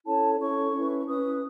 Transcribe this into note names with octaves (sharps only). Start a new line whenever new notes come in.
C#4 E4 A4 C#5 A5
C#4 E4 A4 C#5 C#6
C#4 E4 B4
C#4 E4 B4 D#6